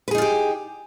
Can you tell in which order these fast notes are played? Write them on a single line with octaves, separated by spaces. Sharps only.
B4 G#4 D#4 F4 G4